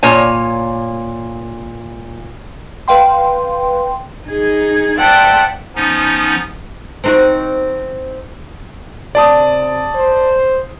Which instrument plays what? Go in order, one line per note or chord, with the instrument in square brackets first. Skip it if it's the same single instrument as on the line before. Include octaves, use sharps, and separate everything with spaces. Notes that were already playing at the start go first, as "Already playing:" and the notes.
[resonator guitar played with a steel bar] A#2 A#3 C#5 G#5
[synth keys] B4 F5 G5 C6
[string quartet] D#4 G#4
C5 D5 E5 F#5 G5 A5
[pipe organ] F3 B3 C#4 D#4
[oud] C4 D#4 F#4
[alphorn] C3 [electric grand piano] D5 A5 D#6
[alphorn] C5